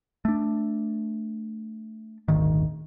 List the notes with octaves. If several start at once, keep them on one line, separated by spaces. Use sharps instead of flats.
A3 D4
D#1 G#1 D2 D#3